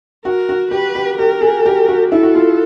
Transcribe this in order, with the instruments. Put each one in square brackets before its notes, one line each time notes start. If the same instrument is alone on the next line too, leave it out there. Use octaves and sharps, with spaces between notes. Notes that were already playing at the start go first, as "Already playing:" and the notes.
[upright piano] F#4 [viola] A#4
[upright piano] F#4
[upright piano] G4 [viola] B4
[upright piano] G4
[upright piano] G4 [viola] A#4
[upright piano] G#4
G4
F#4
[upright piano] E4 [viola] A4
[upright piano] F#4
F4